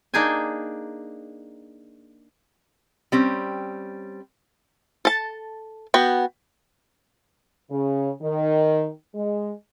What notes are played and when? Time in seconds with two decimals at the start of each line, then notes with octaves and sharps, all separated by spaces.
0.14 A#3 D4 D#4 G#4 G5 G#5
3.12 G3 C4 C#4
5.05 A4 A5
5.94 B3 F#4 G5
7.71 C#3
8.21 D#3
9.15 G#3